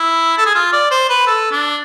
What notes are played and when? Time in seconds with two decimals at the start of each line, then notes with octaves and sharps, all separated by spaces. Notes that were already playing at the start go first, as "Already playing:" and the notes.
Already playing: E4
0.38 A4
0.46 G#4
0.55 F4
0.73 D5
0.91 C5
1.09 B4
1.27 A4
1.51 D4